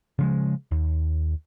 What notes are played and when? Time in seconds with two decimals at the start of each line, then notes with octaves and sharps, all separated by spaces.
0.19 C#3 F3 G#3
0.71 D#2